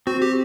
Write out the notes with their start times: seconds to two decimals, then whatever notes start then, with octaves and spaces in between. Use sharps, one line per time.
0.07 C4 F#4
0.22 G4